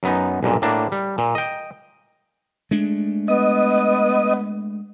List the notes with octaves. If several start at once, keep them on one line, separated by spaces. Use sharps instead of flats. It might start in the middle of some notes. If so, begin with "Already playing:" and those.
F#2 B3 D#4
B1 G2 A#2
A2 A#3 D4
G3
A#2
D#5 G5
G#3 A3 D4
B3 D#5